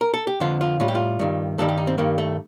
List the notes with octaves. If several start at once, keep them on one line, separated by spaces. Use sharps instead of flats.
A#4
A4
G4
F2 D3 F3 F4
F4
A2 G3 F4
G4
F4
G2 D#3 G3
G2 D#3 G3 A4
G4
D#4
C4
G2 D#3 G3 A#3
A3